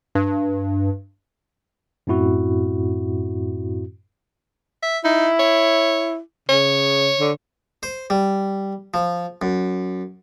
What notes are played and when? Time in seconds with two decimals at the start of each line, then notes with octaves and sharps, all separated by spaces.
0.15 G2
2.07 F#2 A2 C4 E4 F#4
4.82 E5
5.04 D#4 E4
5.39 C#5
6.49 C#3 C#5
7.20 D3
7.83 C5
8.10 G3
8.94 F3
9.42 F#2